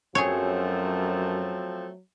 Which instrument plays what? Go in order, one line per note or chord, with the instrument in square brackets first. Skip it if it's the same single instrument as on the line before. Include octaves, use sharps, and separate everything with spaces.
[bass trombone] F#2 [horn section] F3 A3 C4 [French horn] F#3 [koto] G#4 C#5